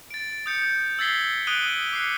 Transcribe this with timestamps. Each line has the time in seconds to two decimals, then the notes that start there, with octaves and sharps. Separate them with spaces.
0.11 A6 D7
0.46 D#6 G6 C#7
0.99 E6 G#6 A6 B6 C7 G7
1.47 D#6 F#6 D7 D#7 G7
1.93 D6 F#6 C7 C#7